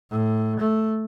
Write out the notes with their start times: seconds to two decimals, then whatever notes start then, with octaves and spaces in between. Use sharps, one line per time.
0.10 A2
0.59 A3